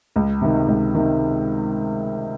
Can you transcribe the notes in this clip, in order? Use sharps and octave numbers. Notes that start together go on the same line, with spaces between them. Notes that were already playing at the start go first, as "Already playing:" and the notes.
C#2
C3 D#3
C#2
C3 D#3